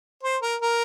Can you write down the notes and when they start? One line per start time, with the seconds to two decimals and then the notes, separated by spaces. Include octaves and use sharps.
0.23 C5
0.42 A#4
0.62 A#4